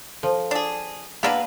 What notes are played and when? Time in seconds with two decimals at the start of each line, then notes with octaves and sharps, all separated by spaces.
0.23 F3 A4 C5
0.51 D4 G#4
1.23 A#3 B3 D4 E4 A#4 B4 F5